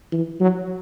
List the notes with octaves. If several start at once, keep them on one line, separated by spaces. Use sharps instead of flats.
E3
F#3